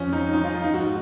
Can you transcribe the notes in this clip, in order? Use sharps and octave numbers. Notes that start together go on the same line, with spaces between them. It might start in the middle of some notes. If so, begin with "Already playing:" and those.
Already playing: F2 F3 C#4
F3 D#4
F3 D#4
F4
F3 D#4
D#4
G#2 F#4